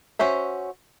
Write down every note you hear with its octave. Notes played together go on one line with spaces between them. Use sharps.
C#4 F#4 C5 E5